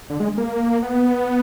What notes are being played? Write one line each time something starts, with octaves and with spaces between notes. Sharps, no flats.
D3
G#3
A#3
B3